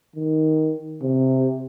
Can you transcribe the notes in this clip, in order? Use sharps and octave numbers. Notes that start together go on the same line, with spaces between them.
D#3
C3